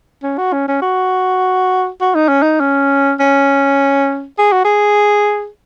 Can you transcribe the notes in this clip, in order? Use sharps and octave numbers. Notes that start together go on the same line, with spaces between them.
C#4
F#4
C#4
C#4
F#4
F#4
D#4
C#4
D#4
C#4
C#4
G#4
F#4
G#4